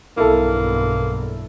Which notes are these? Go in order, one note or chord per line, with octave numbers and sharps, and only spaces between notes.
B1 E2 G2 A#3 E4 A4